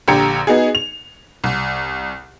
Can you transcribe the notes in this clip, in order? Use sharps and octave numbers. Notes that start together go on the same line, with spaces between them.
A#1 D3 G4 A#5 G#6 C#7
B3 D#4 F#4 G#4
F7
C2